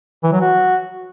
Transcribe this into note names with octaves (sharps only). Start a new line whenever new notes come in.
E3
F#3
F#4